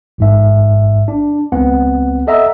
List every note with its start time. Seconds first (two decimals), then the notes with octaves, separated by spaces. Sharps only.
0.18 A1 G#2 E5
1.08 D4
1.52 C#2 B3 C4 F#5
2.27 A4 D#5 E5 F#5 A#5 E6